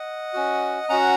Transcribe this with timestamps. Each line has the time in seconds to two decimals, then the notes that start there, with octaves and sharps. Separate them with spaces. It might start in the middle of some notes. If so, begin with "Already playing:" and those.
Already playing: D#5 F#5
0.33 C#4 F#4
0.89 C#4 F#4 F#5 A#5